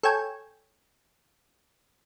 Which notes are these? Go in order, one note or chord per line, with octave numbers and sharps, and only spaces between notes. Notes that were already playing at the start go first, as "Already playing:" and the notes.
A4 C#5 G5 G#5